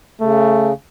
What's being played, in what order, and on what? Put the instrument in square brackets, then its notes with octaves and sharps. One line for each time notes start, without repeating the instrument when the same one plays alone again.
[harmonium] C#3 [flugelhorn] A3